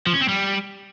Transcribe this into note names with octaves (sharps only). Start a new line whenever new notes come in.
F3
C#4
C4
G3